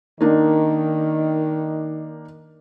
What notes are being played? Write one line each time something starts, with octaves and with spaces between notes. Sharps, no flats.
D#3 A#3 D4 D#4